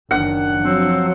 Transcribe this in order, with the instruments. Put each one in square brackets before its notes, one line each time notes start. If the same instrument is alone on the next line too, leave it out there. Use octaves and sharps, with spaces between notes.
[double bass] F#1 D#3 [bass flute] D4 [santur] F#5
[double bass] F3 F#3 [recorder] C4